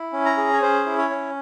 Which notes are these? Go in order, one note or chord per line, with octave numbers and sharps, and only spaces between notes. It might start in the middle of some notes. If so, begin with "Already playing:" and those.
Already playing: E4
C#4
A#5
G#4
C#5
C#4 C5
E4
C#5
C#4